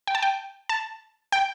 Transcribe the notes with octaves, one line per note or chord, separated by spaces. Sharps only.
G5
A5
G5
A5
G5